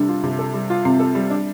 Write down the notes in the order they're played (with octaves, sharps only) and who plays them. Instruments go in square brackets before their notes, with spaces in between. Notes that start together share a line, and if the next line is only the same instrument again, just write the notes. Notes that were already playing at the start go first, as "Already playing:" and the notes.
Already playing: [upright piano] C3 G3 A4 [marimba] D4
[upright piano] F4
C3
A4
G3
F4
[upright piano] C3 [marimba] C4
[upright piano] A4
G3
D4